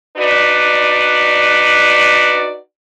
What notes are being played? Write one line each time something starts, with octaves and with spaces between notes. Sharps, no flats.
D4 D#4 F#4 B4 D5